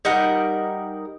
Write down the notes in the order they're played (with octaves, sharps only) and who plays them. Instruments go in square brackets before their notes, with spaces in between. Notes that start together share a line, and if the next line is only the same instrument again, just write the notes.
[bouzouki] G3 D#4 A#4 F#5